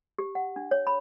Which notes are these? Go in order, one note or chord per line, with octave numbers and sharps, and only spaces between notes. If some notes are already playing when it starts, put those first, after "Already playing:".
G4
F#5
D4
C#5
B5